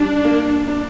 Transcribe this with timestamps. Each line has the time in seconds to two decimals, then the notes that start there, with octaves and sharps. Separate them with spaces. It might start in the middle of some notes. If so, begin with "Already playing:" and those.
Already playing: G3 D4
0.25 A#3
0.68 D4